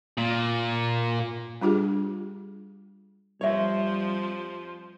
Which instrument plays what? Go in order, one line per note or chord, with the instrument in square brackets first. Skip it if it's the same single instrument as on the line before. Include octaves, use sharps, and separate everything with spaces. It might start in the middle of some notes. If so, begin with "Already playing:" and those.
[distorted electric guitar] A#2
[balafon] G3 D4 F4 G4 G#4
[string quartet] F2 F3 [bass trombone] G3 [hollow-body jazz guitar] C#5 E5